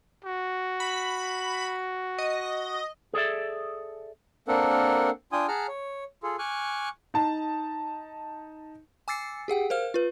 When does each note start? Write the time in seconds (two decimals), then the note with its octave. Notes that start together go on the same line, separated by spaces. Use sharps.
0.25 F#4
0.80 B5
2.18 D#5
3.14 G#4 A4 D5 E5
4.48 A#3 C4 D4 A4 A#4 F#5
5.32 D4 F4 G5 G#5 D#6
5.48 G#4 F#5 A5 A#5 F6
5.68 C#5
6.23 F4 G#4 A4
6.39 G#5 C#6 D6 F6 F#6
7.14 D#4 A5
9.08 G#5 D6 E6 A6 C7 C#7
9.48 G4 G#4 F#5 G5
9.70 A#4 C5 F5 F6
9.94 F4 B4